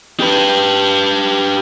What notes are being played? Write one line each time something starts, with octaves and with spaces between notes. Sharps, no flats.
G4 B4